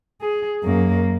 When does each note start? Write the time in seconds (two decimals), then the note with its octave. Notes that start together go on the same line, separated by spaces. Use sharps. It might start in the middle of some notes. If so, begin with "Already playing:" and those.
0.21 G#4
0.64 F#2 A#3